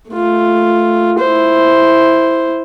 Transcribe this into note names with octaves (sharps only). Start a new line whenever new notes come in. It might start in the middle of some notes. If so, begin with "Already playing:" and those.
A3 F4
E4 C5